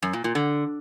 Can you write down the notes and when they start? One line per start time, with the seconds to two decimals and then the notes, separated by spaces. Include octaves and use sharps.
0.02 F#2
0.13 A#2
0.24 A#2
0.35 D3